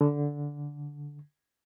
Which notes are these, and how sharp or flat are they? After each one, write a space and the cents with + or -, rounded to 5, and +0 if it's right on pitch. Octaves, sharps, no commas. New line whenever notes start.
D3 -10